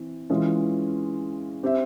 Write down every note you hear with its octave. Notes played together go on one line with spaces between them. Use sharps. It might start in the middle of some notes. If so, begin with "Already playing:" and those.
Already playing: E3 C4
E3 G#3 C#4 F4
C4 G4 C5 E5